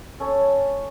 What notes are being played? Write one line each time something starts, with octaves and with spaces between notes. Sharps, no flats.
C#4 A4 C#5 G#5